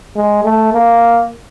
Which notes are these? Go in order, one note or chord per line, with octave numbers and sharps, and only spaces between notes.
G#3
A3
A#3